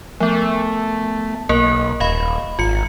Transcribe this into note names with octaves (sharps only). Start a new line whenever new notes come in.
F3 A3 B3
B1 A#3 A#4
D#1 D#5 F5 B5
G#1 F4 C#7